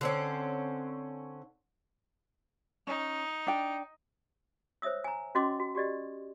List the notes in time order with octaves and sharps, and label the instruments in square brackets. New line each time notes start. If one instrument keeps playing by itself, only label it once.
[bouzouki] D3 C4 C#4
[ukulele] C#4 [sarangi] D#4
[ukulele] D4 G5
[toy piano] C5 C#5 E5 D#6 E6
G#5 A#5
C#4 F#4 D#5 C6 D6
F#4
F#4 G4 D5 D#5